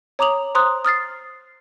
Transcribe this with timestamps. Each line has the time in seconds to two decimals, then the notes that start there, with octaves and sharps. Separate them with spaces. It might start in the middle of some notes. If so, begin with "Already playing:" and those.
0.19 C#5 A#5 D6 D#6 F7 F#7
0.55 C5 A#5 C6 D#6 F#6
0.85 D#6 F6 A6 C7